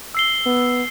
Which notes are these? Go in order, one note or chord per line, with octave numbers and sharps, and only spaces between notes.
E6 C7 G7
B3